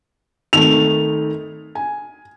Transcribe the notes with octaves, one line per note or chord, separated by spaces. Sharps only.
G#1 D#3 A3 F7
G#5